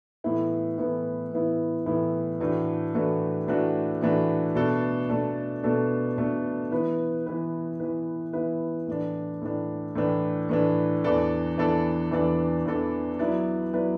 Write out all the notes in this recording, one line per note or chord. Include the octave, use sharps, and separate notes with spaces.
A2 E3 B3 E4
A2 E3 B3 E4
A2 E3 B3 E4
A2 E3 B3 E4
A2 E3 A3 D4 F#4
A2 E3 A3 D4 F#4
A2 E3 A3 D4 F#4
A2 E3 A3 D4 F#4
B2 A3 D4 A4
B2 A3 D4 A4
B2 A3 D4 A4
B2 A3 D4 A4
E3 B3 E4 B4
E3 B3 E4 B4
E3 B3 E4 B4
E3 B3 E4 B4
A2 E3 D4
A2 E3 D4
A2 E3 D4
A2 E3 D4
E2 E3 D4 A4 D5
E2 E3 D4 A4 D5
E2 E3 D4 A4 D5
E2 E3 D4 A4 D5
F#3 B3 E4 B4 D5
F#3 B3 E4 B4 D5